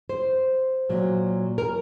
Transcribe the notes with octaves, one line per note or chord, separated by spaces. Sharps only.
C5
A#2 F#3
A#4